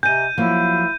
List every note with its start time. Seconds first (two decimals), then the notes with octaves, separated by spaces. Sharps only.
0.03 C3 D#5 G#5 G6 D#7
0.38 F3 F#3 A#3 E4